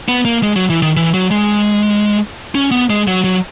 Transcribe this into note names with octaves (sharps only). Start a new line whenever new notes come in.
B3
A#3
G#3
F#3
E3
D#3
E3
F#3
G#3
C#4
B3
G#3
F#3
F#3